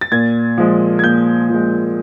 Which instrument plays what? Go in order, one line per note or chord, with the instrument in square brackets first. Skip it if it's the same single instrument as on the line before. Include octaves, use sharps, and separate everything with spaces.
[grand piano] A6
A#2 G#6
F3 G#3
G#6
A#2 G6
F3 G#3